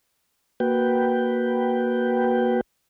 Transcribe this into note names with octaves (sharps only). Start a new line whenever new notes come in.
A#3 F#4 B4 G5